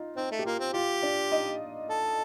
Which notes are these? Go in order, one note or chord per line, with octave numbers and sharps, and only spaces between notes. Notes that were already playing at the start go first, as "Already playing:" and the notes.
Already playing: D#4 F4
C4 D#4
A3
G4
A#3 F4
C4
F4 G4
D4 D5
D#4 D#5
A4